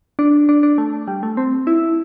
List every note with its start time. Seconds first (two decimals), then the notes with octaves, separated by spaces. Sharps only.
0.19 D4
0.49 D4
0.63 D4
0.78 A3
1.08 G3
1.23 A3
1.37 C4
1.67 E4